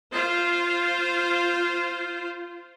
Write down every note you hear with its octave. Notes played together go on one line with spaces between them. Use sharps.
F4 C5